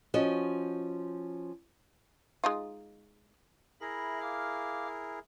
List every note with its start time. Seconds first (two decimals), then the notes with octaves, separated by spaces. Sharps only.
0.14 F3 C#4 F#4 D#5
2.44 G#3 D#4 F4
3.81 E4 G#4 A#4 E5 B5 A#6
4.22 F5 D6 F6